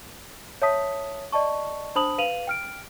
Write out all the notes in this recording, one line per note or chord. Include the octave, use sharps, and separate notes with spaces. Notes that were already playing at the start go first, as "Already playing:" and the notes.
C#5 E5 A5 D#6 B6
D5 D#5 A5 C#6
D4 C5 A5 B5 D#6 F#7
B4 F5 D#7 F7 F#7
G5 F6 D7